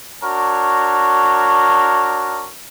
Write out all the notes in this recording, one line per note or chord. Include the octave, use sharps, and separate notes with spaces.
D4 F#4 A#4 C#5